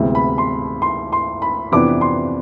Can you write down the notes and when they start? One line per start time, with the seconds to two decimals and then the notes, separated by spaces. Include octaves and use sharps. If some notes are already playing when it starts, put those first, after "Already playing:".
Already playing: D2 C3 E3 G#3 B3
0.15 B5
0.38 C6
0.82 C6
1.12 C6
1.42 B5
1.72 F2 C3 E3 B3 D4 D6
2.01 C6